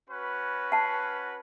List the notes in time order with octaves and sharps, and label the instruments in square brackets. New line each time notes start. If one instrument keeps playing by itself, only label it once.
[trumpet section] C#4 F#4 B4
[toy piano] F#5 A5